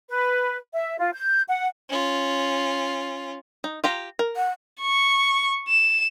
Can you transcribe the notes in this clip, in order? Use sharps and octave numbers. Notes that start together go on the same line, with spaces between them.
B4
E5
F4
G6
F#5
C#4 F4
D#4
F4 G4 A#5
A#4
F#5
C#6
E7